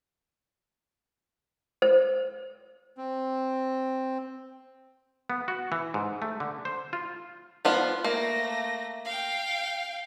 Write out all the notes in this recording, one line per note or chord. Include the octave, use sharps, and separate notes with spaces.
C5
C4
B3
F#4
E3
G#2
A3
D3
C5
F4
F3 B3 F4
A3 A#3 A#6
F5 G5